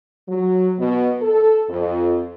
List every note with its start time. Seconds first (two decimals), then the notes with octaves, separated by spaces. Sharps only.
0.29 F#3
0.79 B2
1.22 A4
1.70 F2